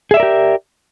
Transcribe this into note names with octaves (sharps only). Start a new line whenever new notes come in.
G4 G#4 A#4 D5 E5